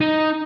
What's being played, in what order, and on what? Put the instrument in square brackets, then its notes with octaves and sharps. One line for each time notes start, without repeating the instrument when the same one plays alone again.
[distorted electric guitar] D#4